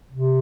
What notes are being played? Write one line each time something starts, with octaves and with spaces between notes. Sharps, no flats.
C3